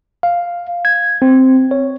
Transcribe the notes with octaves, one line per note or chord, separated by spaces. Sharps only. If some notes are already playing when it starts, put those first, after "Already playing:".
F5
G#6
C4
C#5